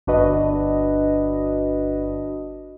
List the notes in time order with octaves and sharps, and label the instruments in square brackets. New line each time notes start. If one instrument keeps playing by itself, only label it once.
[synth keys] G1 D4 F#4 B4 D#5